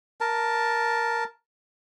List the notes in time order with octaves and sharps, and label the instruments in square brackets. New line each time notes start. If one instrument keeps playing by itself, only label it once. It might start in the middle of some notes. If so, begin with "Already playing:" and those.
[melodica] A#4 A5